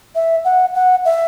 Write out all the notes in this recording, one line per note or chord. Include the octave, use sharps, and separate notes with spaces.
E5
F#5
F#5
E5